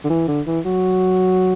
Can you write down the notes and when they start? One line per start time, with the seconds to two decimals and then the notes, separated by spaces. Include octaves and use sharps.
0.04 D3
0.10 E3
0.28 D3
0.47 E3
0.65 F#3